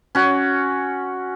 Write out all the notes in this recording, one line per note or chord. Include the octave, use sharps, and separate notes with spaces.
C#4 F#4